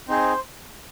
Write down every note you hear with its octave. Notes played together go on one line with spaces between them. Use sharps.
C4 D#4 G#4 C5